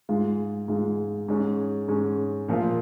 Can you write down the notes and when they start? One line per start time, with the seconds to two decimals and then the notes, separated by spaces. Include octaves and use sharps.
0.09 G#2 G#3 F4
0.68 G#2 G#3 F4
1.28 G#2 G#3 C#4
1.88 G#2 G#3 C#4
2.48 A#2 F3 A#3 F4